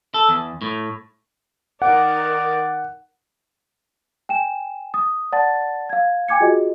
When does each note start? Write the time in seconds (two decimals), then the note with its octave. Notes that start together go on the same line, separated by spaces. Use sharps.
0.14 A4
0.29 E2
0.62 A2
1.82 D#3 A#4 D5 F#5
4.29 G5 G#5 E7
4.94 D#6
5.32 D5 F#5 A5 A6
5.89 F5 G#6
6.28 G5 G#5 D6 G#6 C#7
6.40 F4 F#4 G#4 D#5